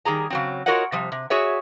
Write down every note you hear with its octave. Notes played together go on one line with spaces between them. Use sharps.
D#3 G3 G#4 A#5
C#3 F#3 C4
F4 F#4 A#4 C#5 D#5 F#5
C3 F3 G3
C3
F#4 G#4 C#5 E5